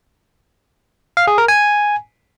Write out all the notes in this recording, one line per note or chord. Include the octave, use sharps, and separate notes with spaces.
F5
G#4
A#4
G#5